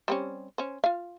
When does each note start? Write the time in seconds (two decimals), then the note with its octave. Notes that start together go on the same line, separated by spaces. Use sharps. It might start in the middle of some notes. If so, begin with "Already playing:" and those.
0.08 G3 C4 C#4
0.58 C#4 C5
0.84 F4 F5